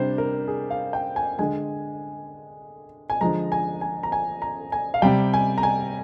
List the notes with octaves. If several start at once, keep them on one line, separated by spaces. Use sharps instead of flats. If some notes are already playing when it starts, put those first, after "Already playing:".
Already playing: C3 G3 D4 C5
A#4
G#4
F5
G5
G#5
D3 G#3 G#5
G#5
D3 F3 G#3 A#5
G#5
G#5
A#5
G#5
A#5
G#5
F5
C3 G3 G5
G#5
A#5
G#5